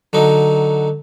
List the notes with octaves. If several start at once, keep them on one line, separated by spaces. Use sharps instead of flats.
D3 F#3 D#4